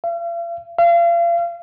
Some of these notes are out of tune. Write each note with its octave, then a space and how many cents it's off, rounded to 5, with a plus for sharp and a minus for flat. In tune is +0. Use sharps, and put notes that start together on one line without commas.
F5 -45
F5 -35